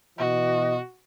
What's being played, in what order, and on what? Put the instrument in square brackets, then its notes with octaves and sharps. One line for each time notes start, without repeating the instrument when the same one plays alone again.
[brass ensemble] B2 E3 D#5 [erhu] F#4